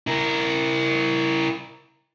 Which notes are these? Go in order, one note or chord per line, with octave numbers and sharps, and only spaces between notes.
E4 A#4